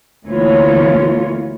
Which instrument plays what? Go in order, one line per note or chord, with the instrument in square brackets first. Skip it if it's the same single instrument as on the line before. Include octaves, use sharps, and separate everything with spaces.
[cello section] D2 B2 E3 A#3 F4 C#5